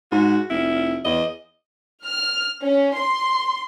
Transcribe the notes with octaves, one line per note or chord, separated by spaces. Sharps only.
G#2 F#4
F1 E4
E2 D#5
F6
C#4
C6